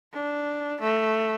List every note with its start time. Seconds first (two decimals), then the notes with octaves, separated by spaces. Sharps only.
0.13 D4
0.81 A3